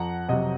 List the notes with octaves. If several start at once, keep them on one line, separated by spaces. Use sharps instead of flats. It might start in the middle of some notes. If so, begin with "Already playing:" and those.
Already playing: F2 F#5 A#5
C3 F#3 D#5 F#5